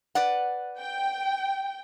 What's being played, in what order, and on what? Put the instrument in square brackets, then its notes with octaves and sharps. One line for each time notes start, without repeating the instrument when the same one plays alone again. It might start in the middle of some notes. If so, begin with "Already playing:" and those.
[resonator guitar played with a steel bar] B4 D5 F#5
[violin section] G5